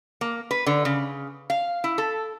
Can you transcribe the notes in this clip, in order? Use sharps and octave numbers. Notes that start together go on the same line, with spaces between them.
A#3
B4
D3
C#3
F5
E4
A4